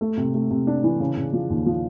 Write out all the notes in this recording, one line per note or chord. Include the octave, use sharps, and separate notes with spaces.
A3
C3
A3
C3
D4
E3
C#3
C#3
F3
D#2
F3